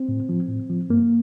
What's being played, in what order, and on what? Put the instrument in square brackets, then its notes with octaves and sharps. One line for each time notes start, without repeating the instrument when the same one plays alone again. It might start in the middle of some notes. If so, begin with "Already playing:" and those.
Already playing: [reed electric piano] C4
A2
F3
A2
F3
G2 A#3